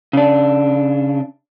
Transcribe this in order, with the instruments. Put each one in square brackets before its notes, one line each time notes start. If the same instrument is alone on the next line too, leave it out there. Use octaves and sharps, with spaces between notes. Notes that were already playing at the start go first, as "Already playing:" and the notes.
[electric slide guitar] C#3 D4